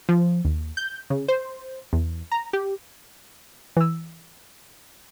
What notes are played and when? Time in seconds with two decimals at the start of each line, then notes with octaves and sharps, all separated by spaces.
0.09 F3
0.45 D#2
0.77 G6
1.10 C#3
1.28 C5
1.93 E2
2.32 A#5
2.53 G4
3.77 E3 E6